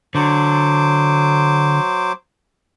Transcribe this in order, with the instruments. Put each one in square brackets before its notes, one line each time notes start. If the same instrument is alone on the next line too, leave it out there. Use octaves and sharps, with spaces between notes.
[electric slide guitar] D3 [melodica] F#3 C5 D6